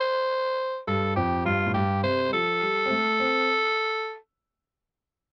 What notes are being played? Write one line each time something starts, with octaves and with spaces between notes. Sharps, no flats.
C5
G2 A4
F2 G4
G2 F4
A2
G2 G4
C3 C5
G3
F3 A4
G3
C4
A3
C4